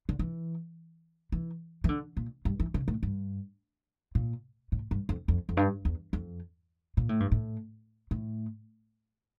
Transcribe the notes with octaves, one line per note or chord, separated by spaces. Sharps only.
D3
E3
E3
E3
D3
A#2
G2
E3
C#3
A2
G2
A#2
A2
G2
F2
F2
F2
G2
E2
F2
A#2
A2
G2
A2
A2